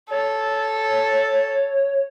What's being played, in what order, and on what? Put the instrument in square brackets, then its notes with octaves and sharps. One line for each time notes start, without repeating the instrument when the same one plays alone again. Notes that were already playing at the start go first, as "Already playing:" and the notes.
[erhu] A4 [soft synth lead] C#5